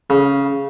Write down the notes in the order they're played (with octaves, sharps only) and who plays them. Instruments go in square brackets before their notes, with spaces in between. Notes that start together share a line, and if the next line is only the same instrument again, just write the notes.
[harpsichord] C#3